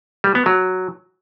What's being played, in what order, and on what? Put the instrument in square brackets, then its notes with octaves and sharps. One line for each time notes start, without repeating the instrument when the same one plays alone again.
[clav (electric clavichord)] G3
B3
F#3